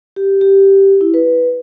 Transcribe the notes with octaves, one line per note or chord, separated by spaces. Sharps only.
G4
G4
E4
B4